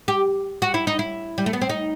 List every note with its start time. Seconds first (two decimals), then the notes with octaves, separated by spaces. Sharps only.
0.08 G4
0.62 F#4
0.74 E4
0.87 D#4
0.99 E4
1.38 G3
1.46 A3
1.53 B3
1.61 C4
1.69 D#4